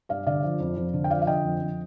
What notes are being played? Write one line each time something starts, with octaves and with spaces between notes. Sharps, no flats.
G2 D5 F5
D3 D5 F5
F3
F2
F2
D3
G5
F3 D5 F5
F5
D3 D#5 G5
F2
F2